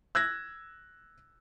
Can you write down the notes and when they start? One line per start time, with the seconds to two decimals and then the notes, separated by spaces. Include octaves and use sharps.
0.15 E6 F#6 G#6 A#6